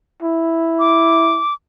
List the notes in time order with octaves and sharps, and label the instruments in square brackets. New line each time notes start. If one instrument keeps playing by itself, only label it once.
[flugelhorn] E4
[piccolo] D6